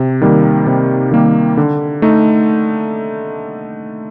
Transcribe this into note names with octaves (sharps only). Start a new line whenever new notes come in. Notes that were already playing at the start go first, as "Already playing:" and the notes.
Already playing: C3
D#3 G3 A#3
C3
D#3 G3 A#3
D3
A3 D#4